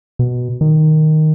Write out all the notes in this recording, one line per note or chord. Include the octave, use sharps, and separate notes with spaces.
B2
D#3